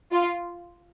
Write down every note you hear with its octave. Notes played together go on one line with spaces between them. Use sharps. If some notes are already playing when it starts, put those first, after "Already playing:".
F4